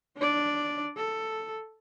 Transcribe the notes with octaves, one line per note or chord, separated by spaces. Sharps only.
D4 D5
A4